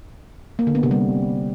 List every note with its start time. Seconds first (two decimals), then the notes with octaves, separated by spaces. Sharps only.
0.59 A#3
0.67 D3
0.75 B3
0.83 C3
0.91 G3